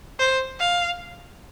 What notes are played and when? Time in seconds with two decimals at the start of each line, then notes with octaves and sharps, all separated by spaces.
0.19 C5
0.60 F5